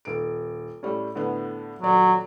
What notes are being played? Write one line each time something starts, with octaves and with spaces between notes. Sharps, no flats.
D#1 D7
A2 G3 C#4
A2 D3 B3
D#1 F#3 D5